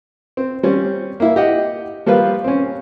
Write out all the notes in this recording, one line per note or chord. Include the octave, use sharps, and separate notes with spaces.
C4
G3 C4 C#4
A#3 E4
G4 D#5 F#5
F3 G3 A#3 F4 B4
C4 C#4